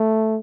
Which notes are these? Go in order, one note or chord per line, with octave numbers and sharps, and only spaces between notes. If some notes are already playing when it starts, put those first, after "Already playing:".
Already playing: A3